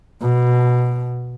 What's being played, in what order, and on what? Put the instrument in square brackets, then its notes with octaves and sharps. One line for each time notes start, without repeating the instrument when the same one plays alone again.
[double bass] B2